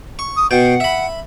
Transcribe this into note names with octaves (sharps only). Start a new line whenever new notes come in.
C#6
D#6
B2 F#5 G5
E5 B5